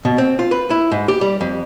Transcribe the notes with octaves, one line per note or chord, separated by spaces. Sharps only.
B2
C4
F4
B4
E4
G#2
G4
G3
F2